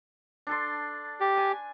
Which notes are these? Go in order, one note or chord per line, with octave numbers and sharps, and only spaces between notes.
D4 A4 C6
G4
G#5